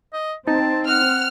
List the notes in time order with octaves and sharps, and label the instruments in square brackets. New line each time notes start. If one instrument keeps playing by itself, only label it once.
[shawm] D#5
[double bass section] C4 [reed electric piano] D#4 [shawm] A5
[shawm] F#5 [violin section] F6